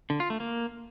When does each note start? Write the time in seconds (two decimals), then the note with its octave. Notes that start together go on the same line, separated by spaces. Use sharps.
0.10 D3
0.20 F4
0.30 A3
0.40 A#3